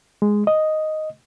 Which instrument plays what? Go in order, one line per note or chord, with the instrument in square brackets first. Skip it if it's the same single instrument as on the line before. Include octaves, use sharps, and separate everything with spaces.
[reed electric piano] G#3
D#5